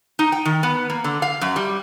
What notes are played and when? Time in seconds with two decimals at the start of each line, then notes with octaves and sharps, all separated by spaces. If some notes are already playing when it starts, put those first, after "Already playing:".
0.19 D#4
0.32 G5
0.45 D#3
0.63 B3
0.90 A#3
1.04 D3
1.22 F5
1.41 F#2
1.56 G3